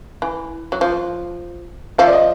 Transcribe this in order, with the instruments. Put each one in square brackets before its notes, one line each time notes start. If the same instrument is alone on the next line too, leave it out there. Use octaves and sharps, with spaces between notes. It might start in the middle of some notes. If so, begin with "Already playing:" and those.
[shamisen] E3
F#3
F3
[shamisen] F3 [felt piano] E5
[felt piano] D5
D#5